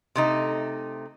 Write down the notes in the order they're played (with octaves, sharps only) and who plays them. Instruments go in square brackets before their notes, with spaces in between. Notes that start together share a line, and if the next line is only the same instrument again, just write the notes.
[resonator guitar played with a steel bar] C3 A3 D#4